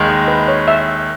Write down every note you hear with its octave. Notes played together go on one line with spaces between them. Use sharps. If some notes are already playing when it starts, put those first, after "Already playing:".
Already playing: D#2 D#3 G#3
D#5
B4
C#5
E5